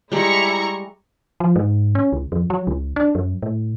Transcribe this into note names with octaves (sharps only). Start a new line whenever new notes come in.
G3 G#3 E4 A#5 C#6
F3
G#2
C#4
C#2
F2
F#3
C#2
D4
F#2
A2